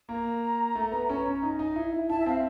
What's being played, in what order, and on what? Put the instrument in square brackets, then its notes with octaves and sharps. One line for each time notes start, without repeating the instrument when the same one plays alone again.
[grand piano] A#3 [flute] A#5
[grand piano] A3
B3
C#4
C#4
D#4
D#4
E4
E4
[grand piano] E4 [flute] A5
[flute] E5
[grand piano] C4 [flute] F5